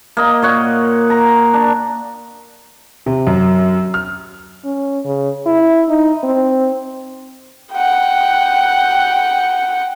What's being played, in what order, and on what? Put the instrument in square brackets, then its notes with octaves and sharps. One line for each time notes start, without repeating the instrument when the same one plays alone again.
[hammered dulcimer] A#3 D#5
A#2 C#5 F#5
A#5
D4
[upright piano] C3
F#2
F6
[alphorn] C#4
C#3
E4
D#4
C4
[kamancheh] F#5 G5